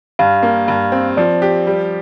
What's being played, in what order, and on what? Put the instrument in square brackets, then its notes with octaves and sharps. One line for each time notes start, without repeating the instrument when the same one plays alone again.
[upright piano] G2 [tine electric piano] F5
[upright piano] A#3
G2
C4
[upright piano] F3 [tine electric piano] D5
[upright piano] G4
G3